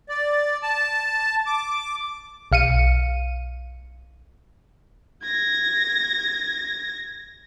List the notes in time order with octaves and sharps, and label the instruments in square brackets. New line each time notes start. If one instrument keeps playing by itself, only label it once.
[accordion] D5
A5
D6
[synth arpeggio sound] B1 F5 C#7 D#7
[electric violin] G#6 A#6